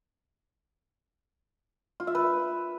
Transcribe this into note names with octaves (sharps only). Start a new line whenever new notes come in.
F4
E5
B4